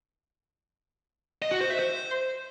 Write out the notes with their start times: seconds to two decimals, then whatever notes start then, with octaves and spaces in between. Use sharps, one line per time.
1.42 D#5
1.51 F#4
1.61 C5
1.70 E5
1.79 C5